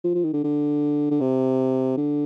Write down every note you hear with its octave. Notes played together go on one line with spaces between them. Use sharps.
F3
F3
D#3
D3
D3
D3
C3
D3